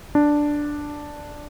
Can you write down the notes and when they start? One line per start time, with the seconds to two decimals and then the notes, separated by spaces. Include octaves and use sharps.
0.15 D4